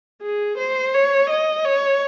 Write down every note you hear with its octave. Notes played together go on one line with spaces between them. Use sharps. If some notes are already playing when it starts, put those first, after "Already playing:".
G#4
C5
C#5
D#5
C#5